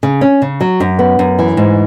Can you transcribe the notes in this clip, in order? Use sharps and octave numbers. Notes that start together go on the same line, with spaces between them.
C#3
C#4
C#3
F#3
F#2
B3
F#2
E3
G#2